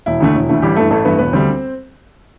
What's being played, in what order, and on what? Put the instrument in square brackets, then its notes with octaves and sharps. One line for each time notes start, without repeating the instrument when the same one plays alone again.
[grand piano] E1 E4
D2 D3 A3
E1
D2 D3 A3
A1 G3 G4
G2 E3 A3 A4
A1 A3 A4
G2 E3 A3 B3 B4
E1 B3 B4
D2 D3 G3 C4 C5